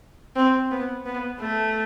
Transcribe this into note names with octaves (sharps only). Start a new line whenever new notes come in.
C4
B3
B3
A3